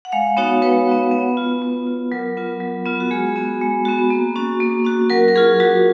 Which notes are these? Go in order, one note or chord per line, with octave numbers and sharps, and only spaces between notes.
F#5
G#3 F5
B3 D#4 F#4 C#5
G#3 B4
B3 D#4 F#4
B3
F4
B3
F4
F#3 A#4
B3 F4
F#3
B3 F4
F#4
G#3 G#4
B3 F#4
G#3
B3 F#4
A#3
C#4 F#4
A#3
C#4 F#4
F#3 A#4
A#4
C#4 F4 G#4
F#3 F#4